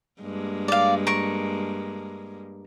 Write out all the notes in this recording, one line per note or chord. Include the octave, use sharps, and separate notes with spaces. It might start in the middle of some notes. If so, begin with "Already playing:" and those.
G2 G#3 A#3
D5 F5
A#4 C#6